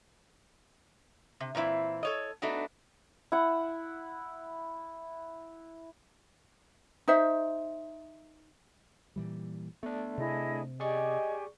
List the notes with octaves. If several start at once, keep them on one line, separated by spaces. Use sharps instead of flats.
C3
A#2 E3 C4 E4
A4 C#5 D#5
A3 B3 D4 D#4 F#4
E4 F#5
D#4 C5 E5
A#2 E3 G3
A3 B3 D4
C3 E4 G#4 D#5
G4 G#4 D5 D#5 G#5 C#6